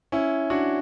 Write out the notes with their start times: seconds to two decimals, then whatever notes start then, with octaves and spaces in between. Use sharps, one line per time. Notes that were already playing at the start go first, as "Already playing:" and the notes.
0.12 C#4 E4
0.50 D4 F#4